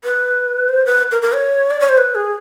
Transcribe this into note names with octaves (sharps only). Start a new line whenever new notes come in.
B4
C5
B4
A#4
A#4
C#5
D5
C#5
C5
B4
G#4